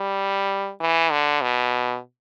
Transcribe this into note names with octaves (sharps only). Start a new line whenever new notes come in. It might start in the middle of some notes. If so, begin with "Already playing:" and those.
Already playing: G3
E3
D3
B2